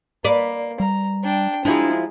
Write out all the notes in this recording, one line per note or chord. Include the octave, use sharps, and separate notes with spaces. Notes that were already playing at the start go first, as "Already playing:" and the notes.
A#3 B4 D5
G3 A#5
D4 G5
F3 G#3 D4 E4 F#4 A#5